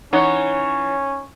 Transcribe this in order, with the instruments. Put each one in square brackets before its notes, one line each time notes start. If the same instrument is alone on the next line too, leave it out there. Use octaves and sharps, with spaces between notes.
[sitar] E3 C#5 [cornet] C#4 [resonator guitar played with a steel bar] D#4 F#5